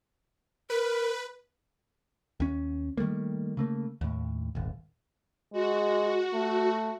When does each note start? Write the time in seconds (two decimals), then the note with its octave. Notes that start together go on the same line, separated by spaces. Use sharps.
0.70 A#4 B4
2.40 D#2 C#4
2.97 D#3 G3 A3 A#3
3.57 C#3 A3 A#3
4.01 D#2 A2
4.55 D#1 G#1
5.53 G#3 F#4
6.33 A3